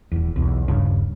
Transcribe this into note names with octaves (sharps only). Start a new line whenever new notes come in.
D#1 E2
B1 E2
D#1 G2 C#3 D4